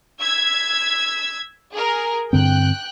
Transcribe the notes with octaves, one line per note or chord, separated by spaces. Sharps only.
E6 G#6 B6
G#4 A#4
G2 D3 C4 G5 F#6